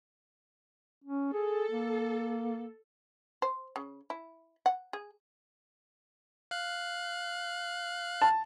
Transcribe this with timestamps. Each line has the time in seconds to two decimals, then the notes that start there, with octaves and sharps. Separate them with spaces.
1.04 C#4
1.33 G#4 A4
1.71 A#3
3.42 C5
3.76 C#3
4.10 E4
4.66 F#5
4.93 G#4
6.51 F5 F#6
8.22 A5